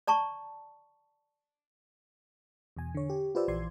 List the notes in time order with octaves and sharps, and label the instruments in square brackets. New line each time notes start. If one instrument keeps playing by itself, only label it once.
[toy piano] D5 A5 A#5 C#6
[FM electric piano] E2 B2 G#5
D3 C#5
G4
F4 G4 B4 C5 D5 E6
A#1 E3 D5 C6 G#6